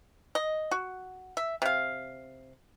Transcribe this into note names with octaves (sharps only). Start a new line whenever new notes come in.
D#5
F#4
E5
C3 F5